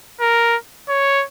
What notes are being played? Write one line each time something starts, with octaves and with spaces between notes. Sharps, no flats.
A#4
C#5